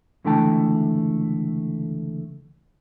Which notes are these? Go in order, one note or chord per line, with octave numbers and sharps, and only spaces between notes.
C#2 D3 E3 A3 G5 A5